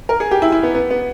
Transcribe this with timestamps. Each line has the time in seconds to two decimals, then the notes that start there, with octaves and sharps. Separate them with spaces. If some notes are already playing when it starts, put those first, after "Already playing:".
0.09 A#4
0.20 G#4
0.31 G4
0.42 E4
0.52 E4
0.63 B3
0.74 B3
0.90 B3